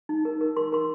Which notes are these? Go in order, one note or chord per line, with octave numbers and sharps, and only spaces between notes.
D#4
A#4
A#4
A#4 C6
A#4 C6